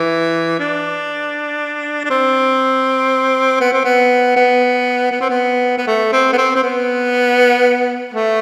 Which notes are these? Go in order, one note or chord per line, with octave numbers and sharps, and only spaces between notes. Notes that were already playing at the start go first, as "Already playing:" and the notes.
Already playing: E3
D4
D4
C4
B3
C4
B3
B3
B3
C4
B3
B3
A3
C4
B3
C4
C4
B3
A3